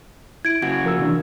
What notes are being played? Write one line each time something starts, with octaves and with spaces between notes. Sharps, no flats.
E4 G#6 D7
C#3 F#3 F#4 G#6
F3 A#4 E6
C3 E3 D4